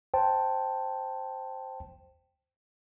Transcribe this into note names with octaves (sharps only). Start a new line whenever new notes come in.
C5 G5 A5